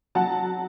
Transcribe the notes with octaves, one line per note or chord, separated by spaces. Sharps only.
F#3 F#5 A5